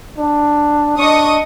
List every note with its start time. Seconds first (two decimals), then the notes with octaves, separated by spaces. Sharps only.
0.18 D4
0.98 D4 D#5 C#6 D#6